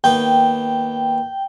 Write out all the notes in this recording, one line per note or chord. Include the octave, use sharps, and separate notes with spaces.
D#2 B3 G5